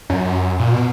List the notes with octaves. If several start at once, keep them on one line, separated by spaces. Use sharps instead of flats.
F#2
A#2
B2